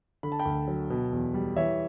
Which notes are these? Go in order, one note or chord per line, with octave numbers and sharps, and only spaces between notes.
D3 B5
A5
G5 B5
D2
F#3
B2
E2
G3
E3 C#5 E5